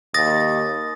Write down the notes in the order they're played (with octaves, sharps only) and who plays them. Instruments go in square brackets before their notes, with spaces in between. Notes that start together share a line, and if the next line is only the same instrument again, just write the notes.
[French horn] D#2 [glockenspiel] D#6 A6 A#6